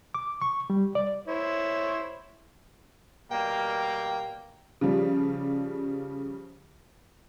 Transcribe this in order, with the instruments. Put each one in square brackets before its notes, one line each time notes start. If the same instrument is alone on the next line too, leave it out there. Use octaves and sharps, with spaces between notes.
[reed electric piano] D6
C#6
G3
D5
[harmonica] E4 C5 C#5
[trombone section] B2 G3 A#3 [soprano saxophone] G5
[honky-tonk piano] C#3 F3 G3